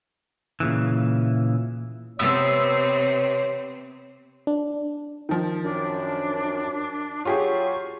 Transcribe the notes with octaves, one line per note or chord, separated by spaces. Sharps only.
A#2 C#3 E3
C3 B3 C4 C#5 E6
D4
D#3 F3
F#2 D4
F#3 F4 G4 G#4 C#6